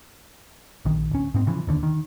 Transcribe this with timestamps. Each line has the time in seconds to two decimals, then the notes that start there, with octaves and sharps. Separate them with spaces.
0.85 A#1 D#3
1.11 D1 C#4
1.34 G#2 B3 C4
1.47 C#3 E3 F3
1.67 D1 D#2 D3
1.83 D#3